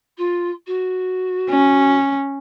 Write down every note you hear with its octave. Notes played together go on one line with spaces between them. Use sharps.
F4
F#4
C#4